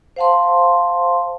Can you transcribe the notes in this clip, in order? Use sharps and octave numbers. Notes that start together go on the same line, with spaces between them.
C5 F5 F#5 A5 C6